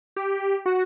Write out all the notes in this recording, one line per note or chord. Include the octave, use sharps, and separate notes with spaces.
G4
F#4